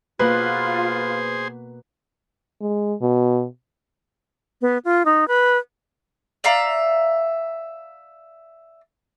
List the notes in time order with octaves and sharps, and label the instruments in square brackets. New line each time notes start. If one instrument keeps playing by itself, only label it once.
[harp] B2 A#3 F#5 [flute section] F4 [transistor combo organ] G#4 C5 [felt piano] B4
[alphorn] G#3
B2
[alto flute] B3
F4
D#4
B4
[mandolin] D5 E5 F5 A#5